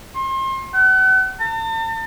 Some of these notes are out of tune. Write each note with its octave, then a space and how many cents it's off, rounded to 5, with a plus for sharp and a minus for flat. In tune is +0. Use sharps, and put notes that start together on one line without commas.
C6 +35
F#5 +35
A5 +40